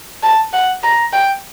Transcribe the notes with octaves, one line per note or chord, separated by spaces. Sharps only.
A5
F#5
A#5
G5